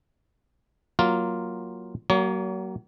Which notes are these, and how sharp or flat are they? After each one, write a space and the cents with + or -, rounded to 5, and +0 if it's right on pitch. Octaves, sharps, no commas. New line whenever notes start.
F#3 +0 A#3 +0 F4 +0
F#3 +30 A#3 +0 C#5 +40